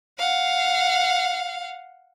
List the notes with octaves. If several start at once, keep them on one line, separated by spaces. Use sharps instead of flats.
F5 F#5